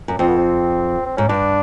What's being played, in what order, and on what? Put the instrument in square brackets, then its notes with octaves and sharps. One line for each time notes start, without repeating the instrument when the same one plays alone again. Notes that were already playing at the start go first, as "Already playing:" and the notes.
[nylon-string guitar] F#2
[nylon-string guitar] F2 [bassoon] C4
[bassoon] B3
C4
C4
[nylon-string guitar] G#2 [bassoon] C#4
[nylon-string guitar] G2 [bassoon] D4